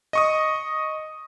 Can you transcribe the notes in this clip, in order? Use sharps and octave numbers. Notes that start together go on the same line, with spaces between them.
D#5 C#6 D#6